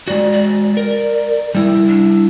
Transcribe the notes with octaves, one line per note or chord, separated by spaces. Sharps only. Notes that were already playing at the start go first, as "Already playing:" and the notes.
G#3 F#4 D5
D5
A#4
G3 E4
D4